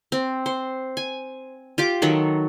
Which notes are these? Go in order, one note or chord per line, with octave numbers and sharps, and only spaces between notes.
C4
C5
G#5
F4 G4 D6
D#3 F#3 A4